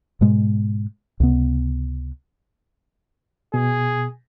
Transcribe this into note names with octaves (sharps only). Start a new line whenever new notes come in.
G#2 B2 G#3
C#2 C3 B3
B2 G#4